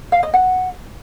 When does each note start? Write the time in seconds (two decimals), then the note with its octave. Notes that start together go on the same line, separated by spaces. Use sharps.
0.12 F5
0.23 D#5
0.34 F#5